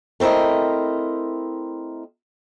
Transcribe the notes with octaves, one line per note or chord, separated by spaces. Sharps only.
A3 C4 E4 A#4 D#5